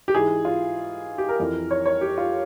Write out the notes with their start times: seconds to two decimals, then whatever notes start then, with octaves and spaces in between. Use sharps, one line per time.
0.08 G4
0.14 G#2 E3 G#4
0.45 F4
1.18 G4
1.29 A#4
1.40 F2 E3
1.71 C#5
1.86 C#5
2.01 G4
2.18 F4